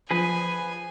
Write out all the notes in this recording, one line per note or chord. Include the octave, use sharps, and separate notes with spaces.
F3 G#4 B4 G#5